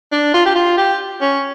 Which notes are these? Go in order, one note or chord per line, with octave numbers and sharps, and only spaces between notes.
D4
F4
G4
F4
G4
C#4